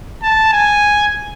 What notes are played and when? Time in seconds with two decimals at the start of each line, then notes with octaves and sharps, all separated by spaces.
0.23 A5
0.53 G#5